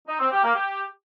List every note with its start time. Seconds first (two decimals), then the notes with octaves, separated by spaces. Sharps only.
0.08 D#4
0.20 C4
0.32 G4
0.43 A#3
0.55 G4